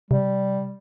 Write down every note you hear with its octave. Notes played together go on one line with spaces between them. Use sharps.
C3 G3